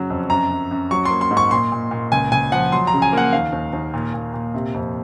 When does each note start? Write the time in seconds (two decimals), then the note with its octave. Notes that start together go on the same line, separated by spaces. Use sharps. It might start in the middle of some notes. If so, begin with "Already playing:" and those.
Already playing: F#2 C#3 F#3
0.10 F2
0.30 F#2 A#5
0.51 F#2
0.71 F#2
0.91 F#3 C#6
1.05 C6
1.10 A#3
1.21 C6
1.31 G#2
1.37 C#6
1.51 A#2 C6
1.72 A#2
1.91 A#2
2.12 C#2 G#5
2.32 C#2 G#5
2.52 F3 F#5
2.72 F#3 C6
2.87 A#5
2.93 C#3
3.02 G#5
3.13 A#3 F#5
3.33 D#2 F5
3.52 D#2
3.73 D#2
3.94 A#2
4.14 A#2
4.34 A#2
4.54 C3
4.74 F2